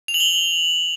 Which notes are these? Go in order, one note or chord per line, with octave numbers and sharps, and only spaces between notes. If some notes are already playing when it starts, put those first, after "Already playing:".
F7
F#7
G7